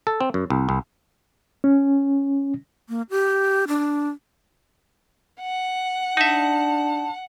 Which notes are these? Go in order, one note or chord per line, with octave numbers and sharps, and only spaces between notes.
A4
C4
F#2
C2
C2
C#4
A#3
G4
D4
F#5
D4 D#4 E5 A5